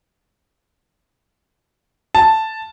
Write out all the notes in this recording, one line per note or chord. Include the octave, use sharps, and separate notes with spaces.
A5